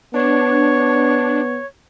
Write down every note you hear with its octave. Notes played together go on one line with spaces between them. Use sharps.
B3 D4 C#5